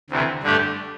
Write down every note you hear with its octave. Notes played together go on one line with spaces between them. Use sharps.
D2 C3 E3
G2 D3 A3 D4 G4